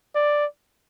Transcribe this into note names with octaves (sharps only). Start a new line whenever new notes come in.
D5